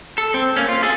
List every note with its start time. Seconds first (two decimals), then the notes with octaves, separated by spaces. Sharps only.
0.18 A4
0.34 C4
0.56 A#3 C#4
0.69 F4
0.83 G#4 A4